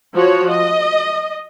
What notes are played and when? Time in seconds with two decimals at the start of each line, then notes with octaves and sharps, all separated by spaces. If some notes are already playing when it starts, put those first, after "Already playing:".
0.14 F3 F4 F#4 C#5
0.50 D#5